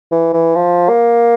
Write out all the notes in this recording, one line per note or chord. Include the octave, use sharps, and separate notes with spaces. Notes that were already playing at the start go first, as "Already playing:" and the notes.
E3
E3
F3
A#3